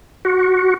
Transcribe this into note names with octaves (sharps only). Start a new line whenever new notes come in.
F#4